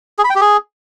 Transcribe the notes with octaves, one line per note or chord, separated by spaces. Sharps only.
G#4
B5
G5
G4
G#4